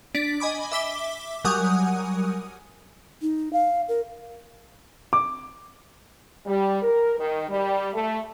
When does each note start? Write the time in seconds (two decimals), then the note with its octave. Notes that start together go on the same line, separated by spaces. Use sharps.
0.15 D4 D5 B6
0.40 D#5 G#5 B5 D6
0.72 E5 D6 B6 G7
1.44 F#3 G3 A#4 F#5 G#5 D#6
3.22 D#4
3.53 F5
3.88 A#4
5.13 D6
6.46 G3
6.82 A#4
7.19 D#3
7.49 G3
7.94 A3